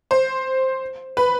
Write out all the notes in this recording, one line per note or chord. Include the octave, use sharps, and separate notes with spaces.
C5
B4